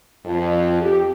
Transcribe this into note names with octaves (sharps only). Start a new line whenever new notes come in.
F2
G4